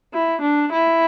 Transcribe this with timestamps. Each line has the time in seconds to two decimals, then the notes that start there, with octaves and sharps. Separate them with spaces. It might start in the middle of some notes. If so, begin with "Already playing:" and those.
0.14 E4
0.43 D4
0.72 E4